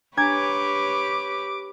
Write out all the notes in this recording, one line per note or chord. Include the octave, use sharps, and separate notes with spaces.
D4 G4 B4 C#5 A#5 D6 G#6